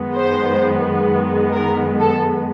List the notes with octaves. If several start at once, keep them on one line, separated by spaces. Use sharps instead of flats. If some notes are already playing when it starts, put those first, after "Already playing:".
Already playing: F#2 D#3 G#3 B3
C5
A#4
A4